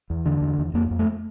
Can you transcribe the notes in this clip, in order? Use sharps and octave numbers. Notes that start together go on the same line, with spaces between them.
E2
D3
E2
E2
F2 A#3
F2
A3